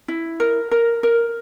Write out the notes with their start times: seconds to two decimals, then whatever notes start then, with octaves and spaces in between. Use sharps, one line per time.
0.08 E4
0.40 A#4
0.71 A#4
1.03 A#4